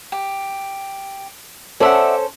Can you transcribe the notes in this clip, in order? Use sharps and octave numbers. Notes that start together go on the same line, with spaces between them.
G4
C#4 A4 C5 D5 E5 F#5